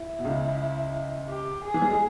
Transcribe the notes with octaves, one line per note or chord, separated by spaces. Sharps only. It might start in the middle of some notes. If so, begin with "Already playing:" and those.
Already playing: E4
B2
C#2 C#3
G4
G#4
E3
G3
G#3